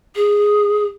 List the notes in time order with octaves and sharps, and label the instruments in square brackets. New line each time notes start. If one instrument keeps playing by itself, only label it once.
[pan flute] G#4